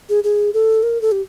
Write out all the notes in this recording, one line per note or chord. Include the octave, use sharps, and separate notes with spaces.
G#4
G#4
A4
A#4
A4
G4